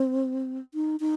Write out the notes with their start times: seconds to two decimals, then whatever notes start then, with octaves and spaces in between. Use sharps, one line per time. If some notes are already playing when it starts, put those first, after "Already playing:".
Already playing: C4
0.74 D#4
1.00 D#4